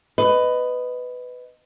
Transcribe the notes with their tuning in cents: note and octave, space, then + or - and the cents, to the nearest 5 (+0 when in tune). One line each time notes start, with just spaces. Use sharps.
B4 +15 D#5 -5